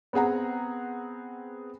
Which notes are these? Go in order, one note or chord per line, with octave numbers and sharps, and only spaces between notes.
B3 C4 G#4 F#5 A#5